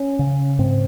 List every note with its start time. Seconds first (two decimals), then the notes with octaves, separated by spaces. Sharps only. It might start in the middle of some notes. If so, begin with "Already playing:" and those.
Already playing: C#4
0.19 C#3
0.59 G#2 C4